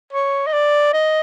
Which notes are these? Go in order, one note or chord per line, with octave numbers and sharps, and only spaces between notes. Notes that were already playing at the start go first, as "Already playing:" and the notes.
C#5
D#5
D5
D#5